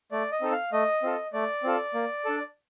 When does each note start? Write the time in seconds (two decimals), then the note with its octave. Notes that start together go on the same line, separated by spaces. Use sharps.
0.12 A3 D5
0.31 D#5
0.41 C4 D#4 A4
0.52 F5
0.72 A3 D#5
1.03 C4 F4 A4
1.33 A3 D5
1.63 C4 F4 A4
1.94 A#3
2.25 D4 A4